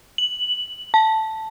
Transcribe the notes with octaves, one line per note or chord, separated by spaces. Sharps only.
F#7
A5